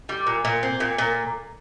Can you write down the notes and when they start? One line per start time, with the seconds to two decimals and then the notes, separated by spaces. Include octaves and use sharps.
0.09 G3
0.27 A#2
0.45 A#2
0.63 C4
0.80 A#2
0.98 A#2